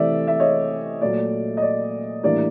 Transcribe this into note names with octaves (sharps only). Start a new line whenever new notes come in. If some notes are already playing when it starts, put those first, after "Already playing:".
Already playing: C3 E3 A3 C4 D5 E5
E5
C#5 D#5
A#2 F#3 A3 D5
D#5
D5
A2 E3 G3 A#3 D4 D5